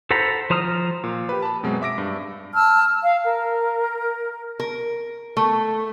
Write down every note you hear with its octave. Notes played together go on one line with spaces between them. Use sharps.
A4 C5 F#5 A#5 B5
F3 C5 A#5 D#6 F6
A#2
G4 B4
A5 B5
F#2 B2 F#3 G#3 C4
E5 D6 A#6 D7
G2
A5 E6 F6
F5
A#4
A#4
A3